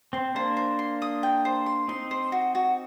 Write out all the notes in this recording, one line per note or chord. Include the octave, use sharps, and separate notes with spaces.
C4 C6
A#3 D4 C5
C5
C6
D#6
G5
C5
C6
C4 D#4 C6
C5
F#4
F#4